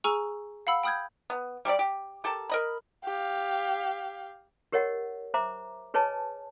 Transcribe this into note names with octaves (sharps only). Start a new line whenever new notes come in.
G#4 G#5 A#5 C#6 E6 F6
F5 F#5 B5 E6
G5 B5 D#6 F6 G6 G#6
B3
G3 A3 G4 D5
G4
G4 A4 A#4 A5
A#4 D#5 B5
G4 F5
G4 A#4 C#5 D#5 F#5
C5 E5 A#5 D6
G#4 B4 C#5 D#5 G#5 A5